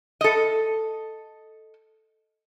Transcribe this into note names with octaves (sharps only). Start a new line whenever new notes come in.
A4 D#5